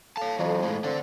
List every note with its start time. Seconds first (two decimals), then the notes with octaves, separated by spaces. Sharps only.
0.17 A4 C#5 F5 A5
0.39 F2 E3 F#3
0.63 A2 G#3
0.84 D3 C4 D4